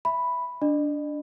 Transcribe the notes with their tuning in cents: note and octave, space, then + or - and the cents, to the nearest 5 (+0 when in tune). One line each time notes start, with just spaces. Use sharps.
E5 +0 B5 +0
D4 -5 D#5 -45